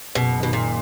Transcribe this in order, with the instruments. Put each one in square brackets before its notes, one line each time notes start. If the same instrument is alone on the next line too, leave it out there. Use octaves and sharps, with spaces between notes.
[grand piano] F#1 [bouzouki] B2
[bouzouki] B2 [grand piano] D#3
[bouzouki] A#2